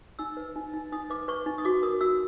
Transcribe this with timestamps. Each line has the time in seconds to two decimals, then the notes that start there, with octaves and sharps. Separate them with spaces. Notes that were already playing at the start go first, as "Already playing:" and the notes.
0.19 D#4 E6
0.37 B4
0.56 D#4
0.74 D#4
0.92 D#4 D#6
1.10 B4 D6
1.28 B4 C#6
1.46 D#4
1.58 D#6
1.65 F#4 D6
1.83 A#4 D#6
2.01 F#4 E6